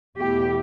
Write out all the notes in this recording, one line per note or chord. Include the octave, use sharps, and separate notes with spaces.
E2 B2 A3 E4 G4